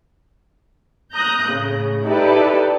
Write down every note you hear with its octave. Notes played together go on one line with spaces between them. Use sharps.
A#5 D#6 F#6 G6 A#6
A2 C#3
D#4 E4 G4 A4 B4 D5